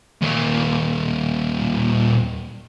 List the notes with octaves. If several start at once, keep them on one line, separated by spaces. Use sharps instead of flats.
D#2 A#2